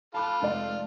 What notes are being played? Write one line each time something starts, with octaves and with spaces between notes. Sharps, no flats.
F4 A4 A5 B5 D6 F#6
F1 G#3 D5 C6